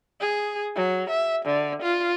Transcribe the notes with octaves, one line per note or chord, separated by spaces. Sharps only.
G#4
F#3
E5
D3
F4